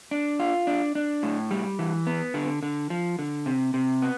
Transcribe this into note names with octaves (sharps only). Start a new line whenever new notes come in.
D4
F4
D4
D4
A2
G3
E3
B3
D3
D3
F3
D3
C3
C3
B3